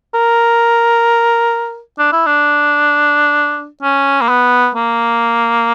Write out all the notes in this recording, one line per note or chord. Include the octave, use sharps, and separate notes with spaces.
A#4
D4
E4
D4
C#4
A#3
B3
A#3